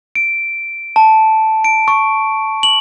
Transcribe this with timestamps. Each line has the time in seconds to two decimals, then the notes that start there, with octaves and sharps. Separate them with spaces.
0.15 D7
0.96 A5
1.64 D7
1.88 C#6
2.63 F#7